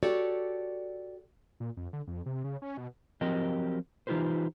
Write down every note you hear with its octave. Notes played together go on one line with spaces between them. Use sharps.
F#4 G4 A4 C#5 D5
A#2
F2
D3
F2
C3
C#3
C#4
B2
F3 F#3 C4 G4 A#4 D#5
E3 D#4 F4 G4 B4 C5